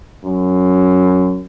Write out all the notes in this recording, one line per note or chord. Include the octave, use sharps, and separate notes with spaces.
F#2